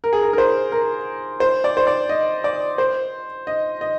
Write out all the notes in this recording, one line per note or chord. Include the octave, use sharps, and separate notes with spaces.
A#4
G#4
A#4
A#4
C5
A#4
C5
D5
C5
D5
D#5
D5
C5
D#5
D#5